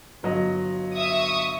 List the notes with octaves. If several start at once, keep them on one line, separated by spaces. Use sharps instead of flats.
G1 F#3 D#5
E5 C#6 D#6